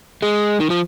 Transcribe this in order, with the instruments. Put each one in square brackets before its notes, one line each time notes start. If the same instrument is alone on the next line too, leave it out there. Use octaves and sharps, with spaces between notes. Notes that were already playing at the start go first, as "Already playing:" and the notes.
[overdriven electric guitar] G#3
D#3
F3